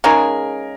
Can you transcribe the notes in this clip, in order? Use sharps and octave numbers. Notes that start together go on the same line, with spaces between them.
C#3 G#3 D#4 G#4 A#4